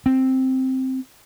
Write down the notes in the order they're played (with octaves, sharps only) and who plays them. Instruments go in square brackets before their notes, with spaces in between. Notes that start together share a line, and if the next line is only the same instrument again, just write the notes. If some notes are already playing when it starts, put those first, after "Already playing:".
[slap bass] C4